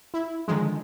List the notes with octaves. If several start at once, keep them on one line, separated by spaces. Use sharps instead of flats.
E4
D3 D#3 F3 G#3